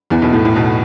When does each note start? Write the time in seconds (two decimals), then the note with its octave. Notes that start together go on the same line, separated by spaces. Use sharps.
0.10 E2 E3
0.22 B1 B2
0.33 A2
0.45 A2
0.55 B1 B2